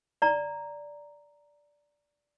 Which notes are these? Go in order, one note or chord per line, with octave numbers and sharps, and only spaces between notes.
D5 A#5